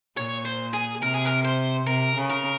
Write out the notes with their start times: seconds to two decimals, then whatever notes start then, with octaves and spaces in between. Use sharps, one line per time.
0.17 A#2 C#5
0.45 C5
0.73 G#4
1.02 C3 A#4
1.14 G#4
1.25 A#4
1.45 C5
1.87 C3 A#4
2.15 C#3
2.30 A#4